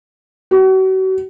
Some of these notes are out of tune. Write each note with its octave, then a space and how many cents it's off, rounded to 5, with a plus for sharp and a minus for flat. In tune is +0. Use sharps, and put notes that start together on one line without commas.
F#4 +40